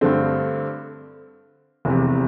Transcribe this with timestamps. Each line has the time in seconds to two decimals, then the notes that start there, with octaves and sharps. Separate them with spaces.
0.01 G2 D3 A3 C4
1.85 F1 E2 C3